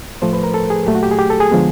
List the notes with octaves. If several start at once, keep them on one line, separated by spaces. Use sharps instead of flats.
A2 F3 A3 C5
B4
A#4
A4
G#4
A#2 F#3 A3 G4
F#4
G4
G#4
G4
A4
G#4
D3 F3 G#3 B3